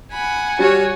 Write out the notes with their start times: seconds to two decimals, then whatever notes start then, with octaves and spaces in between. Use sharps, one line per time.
0.12 F#5 G#5 B5
0.59 G3 F#4 C#5